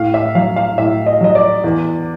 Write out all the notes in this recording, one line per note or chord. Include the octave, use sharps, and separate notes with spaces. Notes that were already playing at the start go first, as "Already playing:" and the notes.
Already playing: A2 F5
E5
F#3 F5
F5
A2 E5
D#5
F#3 D#5
D5
E2